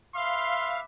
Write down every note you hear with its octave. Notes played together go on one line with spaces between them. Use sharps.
B4 E5 F5 C6 D6